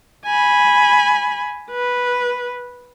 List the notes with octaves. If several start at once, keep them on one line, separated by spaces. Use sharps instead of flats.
G#5 B5
B4